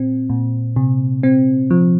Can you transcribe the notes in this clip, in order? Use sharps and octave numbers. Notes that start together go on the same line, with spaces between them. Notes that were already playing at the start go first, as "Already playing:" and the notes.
Already playing: A#2 C4
A#2
C3
C4
F3